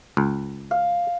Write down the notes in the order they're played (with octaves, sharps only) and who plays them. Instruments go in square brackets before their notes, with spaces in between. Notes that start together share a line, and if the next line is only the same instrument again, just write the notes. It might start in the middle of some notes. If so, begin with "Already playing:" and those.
[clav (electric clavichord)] C#2
[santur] F5